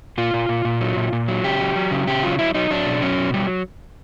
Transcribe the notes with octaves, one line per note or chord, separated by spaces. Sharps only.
A#2 F4
A#2
A#2
A#2
F#3
A#2
A#2
F#3
C#3 G4
F#3
F#3
C#3
C#3 G4
F#3 F4
F#3 E4
F#3 D#4
F#3 D4
B2
F#3 C#4
B2
F#3 G3